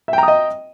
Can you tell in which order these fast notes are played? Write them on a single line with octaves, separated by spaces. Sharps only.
E5 G5 A#5 D#6 D#5